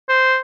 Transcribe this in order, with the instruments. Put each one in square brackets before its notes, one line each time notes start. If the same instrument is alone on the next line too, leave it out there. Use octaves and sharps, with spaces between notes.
[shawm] C5